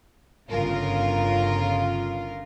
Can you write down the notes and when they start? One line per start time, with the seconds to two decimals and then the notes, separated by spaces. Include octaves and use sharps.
0.48 G1 C#3 F4 A#4